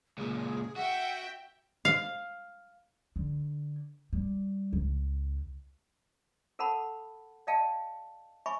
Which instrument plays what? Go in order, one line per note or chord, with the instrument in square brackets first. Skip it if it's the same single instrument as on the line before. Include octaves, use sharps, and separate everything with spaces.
[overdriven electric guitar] C#2 A#2 [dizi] G#4
[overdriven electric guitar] F#4 [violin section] E5 G5 [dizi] F#5
[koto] F5
[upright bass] D3
G3
C#2
[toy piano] A4 A#4 F#5 A5 B5
D5 D#5 F5 G5 A5
E5 G#5 B5 C#6